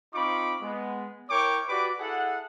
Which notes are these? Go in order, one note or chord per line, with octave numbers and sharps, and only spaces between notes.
C4 D#4 F4 B5 C#6 D6
G#3 B3
E4 A#4 C#5 G5 C#6 D6
F#4 G4 B4 D5 D6
E4 G#4 A4 F#5